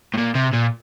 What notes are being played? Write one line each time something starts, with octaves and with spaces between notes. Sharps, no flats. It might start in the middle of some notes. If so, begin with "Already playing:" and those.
A2
A#2
C3
A#2